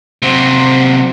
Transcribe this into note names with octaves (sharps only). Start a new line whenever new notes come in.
C3 F#3